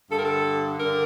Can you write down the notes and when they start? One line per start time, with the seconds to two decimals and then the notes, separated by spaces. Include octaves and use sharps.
0.10 G2 D3 A4
0.18 A#4
0.25 A4
0.79 G2 D3 A#4